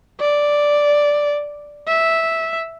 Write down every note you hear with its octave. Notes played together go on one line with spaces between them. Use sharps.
D5
E5